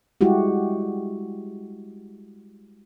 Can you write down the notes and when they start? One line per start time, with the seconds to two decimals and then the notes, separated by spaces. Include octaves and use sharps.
0.21 G3 G#3 E4 F#4 G4